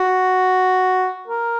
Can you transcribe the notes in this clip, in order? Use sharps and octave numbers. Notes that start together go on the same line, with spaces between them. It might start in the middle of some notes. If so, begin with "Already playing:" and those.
Already playing: F#4
A#4